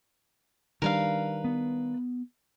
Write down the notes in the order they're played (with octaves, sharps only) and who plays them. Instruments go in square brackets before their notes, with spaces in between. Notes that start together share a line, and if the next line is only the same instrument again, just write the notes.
[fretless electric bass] D#3 G3 D4 [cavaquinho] A#4 B4 F5
[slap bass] B3